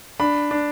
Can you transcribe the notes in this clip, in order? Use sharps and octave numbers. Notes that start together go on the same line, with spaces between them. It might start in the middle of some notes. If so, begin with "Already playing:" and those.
D4 B5
D4